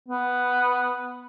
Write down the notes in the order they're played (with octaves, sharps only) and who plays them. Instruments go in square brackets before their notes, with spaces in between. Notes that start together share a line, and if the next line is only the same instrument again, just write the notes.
[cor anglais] B3